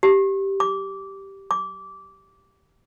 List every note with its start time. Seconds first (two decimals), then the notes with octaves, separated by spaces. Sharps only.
0.03 G4
0.60 D6
1.51 D6